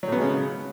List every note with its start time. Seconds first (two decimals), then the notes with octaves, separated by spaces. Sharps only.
0.03 F#3
0.08 A2
0.12 B3
0.17 G#3
0.22 C#3